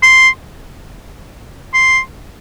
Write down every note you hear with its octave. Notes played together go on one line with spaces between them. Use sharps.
C6
C6